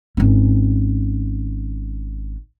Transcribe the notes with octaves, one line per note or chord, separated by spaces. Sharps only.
G#1 C#4